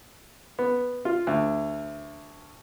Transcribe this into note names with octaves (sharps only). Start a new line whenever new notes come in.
B3
F4
D2